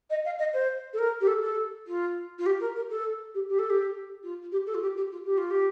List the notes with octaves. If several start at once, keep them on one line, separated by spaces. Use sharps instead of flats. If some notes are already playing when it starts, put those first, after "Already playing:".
D#5
F5
D#5
C5
A4
A#4
G4
A4
A4
F4
F4
G4
A#4
A#4
A4
G4
G4
A4
G4
F4
G4
A4
F4
G4
G4
F4
G4
F4
G4